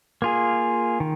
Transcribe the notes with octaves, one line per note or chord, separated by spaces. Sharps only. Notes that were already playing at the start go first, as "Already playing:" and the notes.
A#3 F4 G#4
D#3